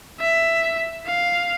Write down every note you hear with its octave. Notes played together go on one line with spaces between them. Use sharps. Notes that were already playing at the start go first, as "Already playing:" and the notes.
E5
F5